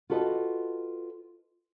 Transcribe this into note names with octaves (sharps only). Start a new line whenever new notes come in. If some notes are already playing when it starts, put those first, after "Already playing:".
F4 F#4 A4 B4 D5 D#5